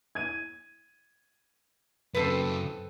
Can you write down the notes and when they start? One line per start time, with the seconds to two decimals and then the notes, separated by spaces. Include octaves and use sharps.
0.15 G#6 D#7
2.14 F#2 C#3 C4 A4 B4